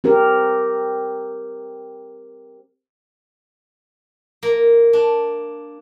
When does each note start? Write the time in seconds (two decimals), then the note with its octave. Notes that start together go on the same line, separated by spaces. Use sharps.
0.04 C4 G4 A#4
4.43 A#3
4.93 D4